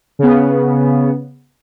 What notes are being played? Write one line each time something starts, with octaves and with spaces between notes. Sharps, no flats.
C#3 B3